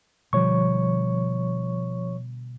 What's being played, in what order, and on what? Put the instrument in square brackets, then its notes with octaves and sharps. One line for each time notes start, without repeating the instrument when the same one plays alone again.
[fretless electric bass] B2 D3 G3 [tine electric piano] F3 C#5 C#6